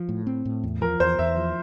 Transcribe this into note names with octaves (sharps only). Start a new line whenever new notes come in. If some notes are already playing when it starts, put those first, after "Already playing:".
Already playing: F3
A2
C4
A2
E2
F3 A#4
E2 C5
E2 E5
F3